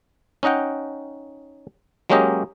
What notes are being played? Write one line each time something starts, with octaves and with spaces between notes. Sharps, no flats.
C#4 D#4 D#5 F#5 G5
F#3 G#3 A#3 C#4 G4 D#5